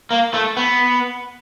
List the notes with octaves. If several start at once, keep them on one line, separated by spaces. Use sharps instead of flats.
A#3
A3
B3